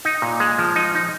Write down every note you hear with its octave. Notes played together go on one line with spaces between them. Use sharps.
D#4
A#2
G#3
F3
D#4
D#4